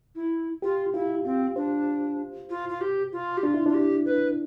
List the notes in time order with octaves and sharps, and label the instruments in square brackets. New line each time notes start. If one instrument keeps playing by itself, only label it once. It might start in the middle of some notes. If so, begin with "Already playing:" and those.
[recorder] E4
[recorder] F4 [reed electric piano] G4
[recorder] E4 [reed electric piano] F4
[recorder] C4 [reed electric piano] F4
[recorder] D4 [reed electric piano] C5
[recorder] F4
F4
G4
F4
G4
[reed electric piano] D4 [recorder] F4
[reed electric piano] E4
[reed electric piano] D4 [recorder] F4
[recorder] G4
B4